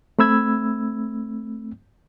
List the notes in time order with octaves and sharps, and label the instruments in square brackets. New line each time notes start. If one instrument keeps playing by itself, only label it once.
[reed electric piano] A3 C4 B5 E6 G#6